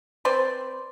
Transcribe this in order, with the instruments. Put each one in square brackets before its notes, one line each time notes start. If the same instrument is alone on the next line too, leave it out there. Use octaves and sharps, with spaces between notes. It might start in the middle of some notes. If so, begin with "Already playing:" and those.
[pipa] C4 B4 C5 D5